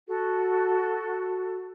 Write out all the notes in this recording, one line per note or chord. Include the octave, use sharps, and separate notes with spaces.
F#4 A4